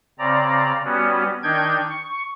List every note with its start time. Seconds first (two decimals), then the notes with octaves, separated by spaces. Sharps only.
0.19 C#3 C4 D5 A#5
0.85 G3 B3 C#4 F#4
1.43 D#3 D4 D#4 G5 G6 G#6
1.90 C#6